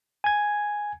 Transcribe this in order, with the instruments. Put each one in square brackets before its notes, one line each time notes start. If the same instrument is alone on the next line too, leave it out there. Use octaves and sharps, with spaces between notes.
[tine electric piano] G#5 G#6